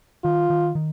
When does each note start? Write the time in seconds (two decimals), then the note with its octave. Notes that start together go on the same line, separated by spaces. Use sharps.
0.24 D#3 F4
0.50 D#3
0.75 D#3